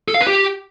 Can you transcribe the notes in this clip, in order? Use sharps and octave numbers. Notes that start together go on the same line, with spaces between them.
A4
F5
B4
G4